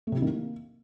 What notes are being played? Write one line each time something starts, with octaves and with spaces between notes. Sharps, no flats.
A3
C3
E4
D#3
A#3